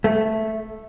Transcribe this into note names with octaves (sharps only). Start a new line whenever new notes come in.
A3